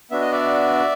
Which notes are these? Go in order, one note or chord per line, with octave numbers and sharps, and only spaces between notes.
B3 D4 F#4 E5
D#5
D5 E5